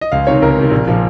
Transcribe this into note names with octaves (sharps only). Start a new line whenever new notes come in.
D#5
C#2 F5
C3 D#3 C#5
C#2 A#4
C3 D#3
A#1
A#2 F3